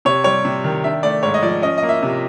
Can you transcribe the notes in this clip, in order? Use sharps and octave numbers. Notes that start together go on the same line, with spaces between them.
C3 C#5
G3 C#5
C3
D#3
D4 E5
A3 D5
G#2 C#5
D#5
F3 D5
C#4 D#5
D#5
A#3
E5
C3